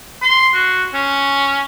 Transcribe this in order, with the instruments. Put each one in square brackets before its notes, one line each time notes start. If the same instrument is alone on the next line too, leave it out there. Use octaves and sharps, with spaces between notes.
[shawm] C6
F#4
C#4